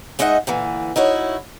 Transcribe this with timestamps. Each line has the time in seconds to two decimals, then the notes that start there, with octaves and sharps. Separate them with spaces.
0.19 G#3 D#4 D#5 E5 F#5
0.47 A#2 D3 E3
0.96 D#4 E4 F#4 C#5